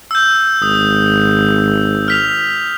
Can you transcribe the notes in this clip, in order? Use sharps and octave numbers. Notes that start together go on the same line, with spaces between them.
E6 G6
G#1 D#6
F6 B6 F7